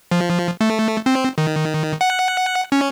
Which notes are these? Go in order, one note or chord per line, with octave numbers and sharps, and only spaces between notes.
F3
A3
C4
D#3
F#5
C#4